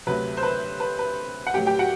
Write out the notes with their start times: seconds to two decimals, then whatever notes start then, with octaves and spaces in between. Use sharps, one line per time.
0.07 D2 C3 F#3 B4
0.37 C5
0.43 B4
0.80 B4
0.99 B4
1.47 F#5
1.54 A2 F#3 G4 G5
1.67 G4 G5
1.79 F#4 F#5